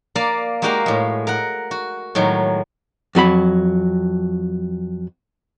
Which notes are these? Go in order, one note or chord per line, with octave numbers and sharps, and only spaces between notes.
A#3 A#4 D5 F5
G#3 A#3 F#4 G4 A#4 F5
A2 G#3
A#4 F#5
F#4
A2 D#3 F#3 G#3
F2 F#3 A4 B5